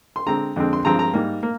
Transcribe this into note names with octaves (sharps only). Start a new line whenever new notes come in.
C6
D3 G#3 C4 A#5
F2 D3 G#3 C4
C6
G2 F3 G#3 C4 A#5
A#5
G#2 G3 A#3
A#3